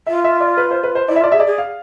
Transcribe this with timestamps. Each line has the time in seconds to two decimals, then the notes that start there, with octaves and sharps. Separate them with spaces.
0.07 F4 E5
0.24 E5
0.40 D5
0.57 B4
0.71 C5
0.83 B4
0.95 C5
1.08 E4 D5
1.16 E5
1.21 F4 D5
1.32 G#4 E5
1.40 D5
1.46 G#4
1.58 F5